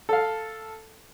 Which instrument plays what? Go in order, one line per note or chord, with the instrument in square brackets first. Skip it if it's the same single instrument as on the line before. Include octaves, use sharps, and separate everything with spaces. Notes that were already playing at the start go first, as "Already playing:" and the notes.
[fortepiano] A4 F5